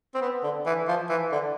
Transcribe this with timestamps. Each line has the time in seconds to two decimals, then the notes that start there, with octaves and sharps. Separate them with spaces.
0.15 C4
0.21 B3
0.43 D3
0.66 E3
0.88 F3
1.10 E3
1.32 D3